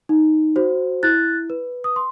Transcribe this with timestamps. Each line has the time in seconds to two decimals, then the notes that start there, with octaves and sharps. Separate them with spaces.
0.09 D#4
0.56 F#4 C5
1.03 E4 F#6 A6
1.50 B4
1.84 D#6
1.96 C6